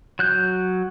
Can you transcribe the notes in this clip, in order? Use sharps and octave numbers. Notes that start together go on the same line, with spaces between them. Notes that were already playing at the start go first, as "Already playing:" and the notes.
F#3 F#6 G6